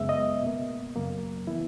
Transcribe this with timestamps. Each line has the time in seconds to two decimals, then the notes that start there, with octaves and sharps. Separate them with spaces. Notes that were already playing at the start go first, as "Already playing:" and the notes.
Already playing: F#2 C#3 G#3 B3 E5
0.09 D#5
0.43 B2 A#3
0.96 F#2 C#3 F#3 A#3
1.47 E3 B3 E4